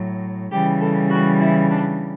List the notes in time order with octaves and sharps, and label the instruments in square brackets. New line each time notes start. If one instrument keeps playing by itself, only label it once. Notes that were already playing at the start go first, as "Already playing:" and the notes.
Already playing: [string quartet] A2 F#3
C#3 E3 G3 G4
A4
F#4
E4
D4